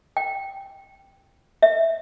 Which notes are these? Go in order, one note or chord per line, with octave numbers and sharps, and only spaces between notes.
G5
E5